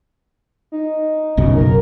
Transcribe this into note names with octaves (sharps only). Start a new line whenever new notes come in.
D#4
B1 F#2 C#3
A#4